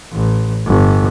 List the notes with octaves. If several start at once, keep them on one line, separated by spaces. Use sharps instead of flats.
A1
G1